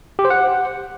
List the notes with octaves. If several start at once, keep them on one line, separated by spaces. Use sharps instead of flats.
G4
C5
F#5